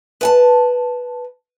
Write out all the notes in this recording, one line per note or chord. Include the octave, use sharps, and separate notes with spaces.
B4 G#5 A5